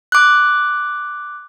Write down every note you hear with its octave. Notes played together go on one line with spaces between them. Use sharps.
D6 F#6